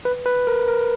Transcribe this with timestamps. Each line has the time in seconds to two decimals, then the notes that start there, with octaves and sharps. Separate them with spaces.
0.05 B4
0.26 B4
0.47 A#4
0.68 A#4